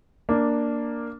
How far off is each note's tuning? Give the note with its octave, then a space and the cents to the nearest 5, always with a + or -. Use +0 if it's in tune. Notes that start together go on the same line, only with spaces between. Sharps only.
A#3 +0 D4 +0